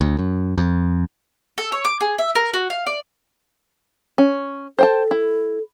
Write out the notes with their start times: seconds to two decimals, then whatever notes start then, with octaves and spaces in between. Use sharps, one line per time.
0.01 D2
0.19 F#2
0.58 F2
1.58 A4
1.72 C#5
1.85 D6
2.01 G#4
2.18 E5
2.35 A#4
2.54 F#4
2.70 F5
2.86 D5
4.18 C#4
4.79 A4 C5 G5 A5
5.11 E4